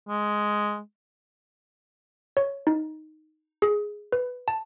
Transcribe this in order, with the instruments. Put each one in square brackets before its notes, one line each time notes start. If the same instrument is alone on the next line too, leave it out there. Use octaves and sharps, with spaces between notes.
[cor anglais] G#3
[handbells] C#5
D#4
G#4
B4
A5